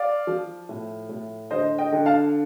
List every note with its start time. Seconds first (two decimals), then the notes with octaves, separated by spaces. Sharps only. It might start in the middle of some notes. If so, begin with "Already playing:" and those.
Already playing: D5 F5
0.27 F3
0.69 A2
1.09 A2
1.51 D3 C5 D#5
1.78 D#5 G5
1.92 D3
2.06 F5 A5